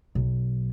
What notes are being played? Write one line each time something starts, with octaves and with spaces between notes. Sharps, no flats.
B1